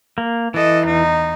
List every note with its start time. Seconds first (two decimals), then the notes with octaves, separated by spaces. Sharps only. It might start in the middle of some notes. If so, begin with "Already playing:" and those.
0.18 A#3
0.54 E3 A4 D#5
0.87 E2 D#4